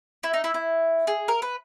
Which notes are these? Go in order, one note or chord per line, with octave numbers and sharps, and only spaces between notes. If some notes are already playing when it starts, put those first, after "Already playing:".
E4
D#4
E4
E4
G#4
A#4
B4